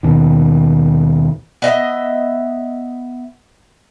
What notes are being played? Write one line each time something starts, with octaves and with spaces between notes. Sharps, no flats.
D#2 B2 D#3
B3 D#5 E5